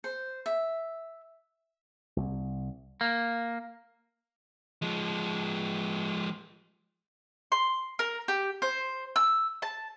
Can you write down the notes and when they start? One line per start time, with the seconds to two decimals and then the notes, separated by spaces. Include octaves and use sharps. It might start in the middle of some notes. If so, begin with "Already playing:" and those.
0.04 C5
0.46 E5
2.16 C2
3.01 A#3
4.82 F3 G#3
7.52 C6
7.99 A#4
8.28 G4
8.62 C5
9.16 E6
9.62 A5